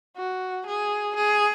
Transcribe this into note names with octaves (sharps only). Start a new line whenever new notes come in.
F#4
G#4
G#4